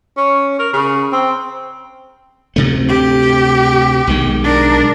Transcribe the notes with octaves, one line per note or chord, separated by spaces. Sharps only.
C#4
A#4
C#3
C4
D2 C3 A3
G4
B1 D#3 G#3
D4 A#4